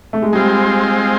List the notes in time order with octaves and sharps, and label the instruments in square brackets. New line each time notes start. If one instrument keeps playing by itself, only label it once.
[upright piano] A3
G#3
[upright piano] G3 [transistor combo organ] G#3 C4 F4